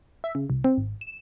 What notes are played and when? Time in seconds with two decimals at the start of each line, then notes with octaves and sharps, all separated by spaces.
0.24 E5
0.35 C#3
0.50 C2
0.64 C4
0.77 G#1
1.01 E7